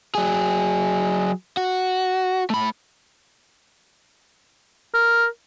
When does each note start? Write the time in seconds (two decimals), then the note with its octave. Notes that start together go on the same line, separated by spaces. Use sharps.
0.15 F#3 G#4
1.57 F#4
2.50 A3 B5
4.94 A#4